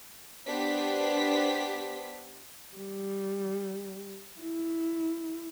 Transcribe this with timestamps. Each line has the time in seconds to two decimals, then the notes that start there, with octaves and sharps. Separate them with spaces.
0.46 B3 D4 G4 C5 B6
2.77 G3
4.41 E4